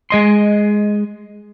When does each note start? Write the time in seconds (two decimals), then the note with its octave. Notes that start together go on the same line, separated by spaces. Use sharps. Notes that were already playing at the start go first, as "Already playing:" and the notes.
0.10 G#3 D#5 C6